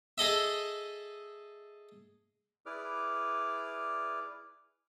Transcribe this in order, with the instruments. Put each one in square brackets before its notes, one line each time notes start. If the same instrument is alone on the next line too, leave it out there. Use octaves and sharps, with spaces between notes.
[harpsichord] G#4 A4 D#5 E5
[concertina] E4 G#4 B4 D5 D6 F6